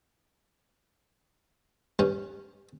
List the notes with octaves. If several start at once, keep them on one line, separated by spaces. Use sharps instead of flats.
G2 C#4